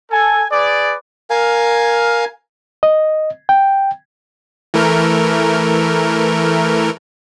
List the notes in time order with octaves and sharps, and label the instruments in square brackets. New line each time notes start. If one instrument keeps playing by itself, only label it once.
[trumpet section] A4 G#5
G#4 B4 D5
[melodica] A#4 F5 G#5
[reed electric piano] D#5
G5
[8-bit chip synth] E3 A3 A#4